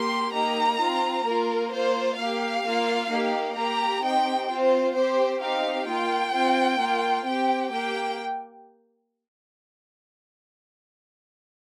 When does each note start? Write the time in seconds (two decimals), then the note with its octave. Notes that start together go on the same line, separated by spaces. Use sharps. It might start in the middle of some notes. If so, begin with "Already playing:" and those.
Already playing: A#3 G4 C6
0.33 A#3 D#4 G4 A#5
0.79 C4 F4
1.25 A#3 F4 A#4
1.72 A#3 F4 C5
2.18 A#3 G4 F5
2.64 A#3 F4
3.10 A#3 D#4 G4
3.56 A#3 G4 A#5
4.02 C4 D#4 G4 G5
4.49 C4 F4 C5
4.95 C4 G4 C5
5.41 C4 D#4 G4 F5
5.87 A#3 F4 G5
6.33 C4 F4
6.80 A#3 F4
7.26 C4 G4 G5
7.72 A#3 G4 G5